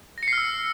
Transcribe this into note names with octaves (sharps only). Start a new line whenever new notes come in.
E6 F6 A#6 C7 C#7